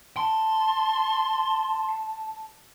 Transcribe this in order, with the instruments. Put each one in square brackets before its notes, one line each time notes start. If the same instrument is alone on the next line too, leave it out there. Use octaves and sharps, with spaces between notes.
[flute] A5 [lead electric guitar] C6